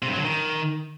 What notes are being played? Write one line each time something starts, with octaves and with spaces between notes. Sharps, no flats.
C3
G2
F#3
D3
D#3